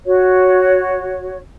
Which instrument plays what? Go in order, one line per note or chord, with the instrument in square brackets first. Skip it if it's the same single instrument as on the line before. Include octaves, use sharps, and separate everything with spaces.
[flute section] F#4 C#5